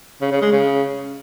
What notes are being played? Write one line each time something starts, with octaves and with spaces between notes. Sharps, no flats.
C#3
C#3
G#3
C#3